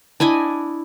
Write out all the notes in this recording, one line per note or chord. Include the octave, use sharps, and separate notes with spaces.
D4 E4 D#5 G#5